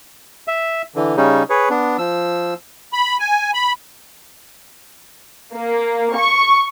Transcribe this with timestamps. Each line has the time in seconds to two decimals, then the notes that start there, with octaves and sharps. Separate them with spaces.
0.48 E5
0.96 D3 E3
1.17 C#3 G3 C#4 D#4
1.50 G#4 B4 C#5
1.70 B3 D4
1.98 F3 E6
2.93 B5
3.20 G#5
3.54 B5
5.52 A#3
6.15 C#6